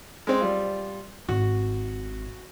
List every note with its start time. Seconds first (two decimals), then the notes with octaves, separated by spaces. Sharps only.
0.27 G#3 C4
0.41 G3 F4
1.29 G#1 F#4